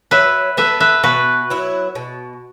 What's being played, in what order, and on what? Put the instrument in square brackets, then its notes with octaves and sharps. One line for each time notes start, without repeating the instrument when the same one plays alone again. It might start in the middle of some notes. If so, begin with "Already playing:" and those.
[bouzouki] F#3 [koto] B4 E5
[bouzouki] B3 A4 [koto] B4 E5
[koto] B4 E5
[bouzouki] B2 [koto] F#4 B4
[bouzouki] F#3 B3 E4
B2